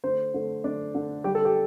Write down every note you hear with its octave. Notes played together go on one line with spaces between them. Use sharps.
D3 A3 C5
D3 A3
D3 A3 D4
D3 A3
D3 G3 G4
A4
G4